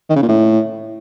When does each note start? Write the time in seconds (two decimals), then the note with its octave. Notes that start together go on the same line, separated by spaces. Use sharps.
0.09 D#3
0.16 C#3
0.22 A#2
0.29 A2